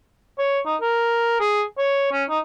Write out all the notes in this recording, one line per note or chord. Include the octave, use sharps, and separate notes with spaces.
C#5
D#4
A#4
G#4
C#5
C#4
D#4